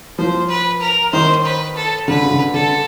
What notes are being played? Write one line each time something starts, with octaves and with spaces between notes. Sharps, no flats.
F3 C5
B4
A#4
D#3 C5
B4
A4
D3 B4
C#3
D3
D3 A4